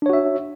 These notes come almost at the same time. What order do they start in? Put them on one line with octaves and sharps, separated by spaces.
D4 C#5 F#4 E5